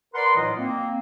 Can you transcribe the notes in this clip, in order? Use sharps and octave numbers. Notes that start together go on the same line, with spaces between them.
A#4 B4 D5 F#5 C6
A2 E3 F#3 D#4 F4 D#5
A#3 C4